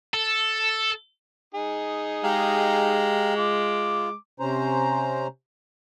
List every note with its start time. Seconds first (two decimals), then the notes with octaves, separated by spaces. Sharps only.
0.14 A4
1.54 D#4 G#4
2.24 G#3 G4 F5 A#5
3.37 F4 D6
4.40 C3 C#4 C5 A#5